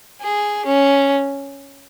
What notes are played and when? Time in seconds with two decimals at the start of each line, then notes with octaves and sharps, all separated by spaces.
0.22 G#4
0.66 C#4